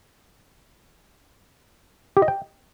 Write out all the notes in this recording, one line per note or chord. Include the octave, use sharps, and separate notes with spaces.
G4
D#5
G5